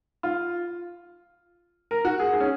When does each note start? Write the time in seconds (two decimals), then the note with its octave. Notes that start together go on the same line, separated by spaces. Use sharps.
0.23 F4
1.91 A#4
2.05 F#4
2.20 G#4
2.33 G#4
2.40 C#4